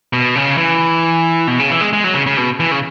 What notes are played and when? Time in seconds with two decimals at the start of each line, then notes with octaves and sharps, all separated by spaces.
0.13 B2
0.35 C#3
0.58 E3
1.47 B2
1.59 C#3
1.71 E3
1.81 G#3
1.93 G#3
2.04 F#3
2.14 C#3
2.26 C#3
2.37 B2
2.60 E3
2.72 C#3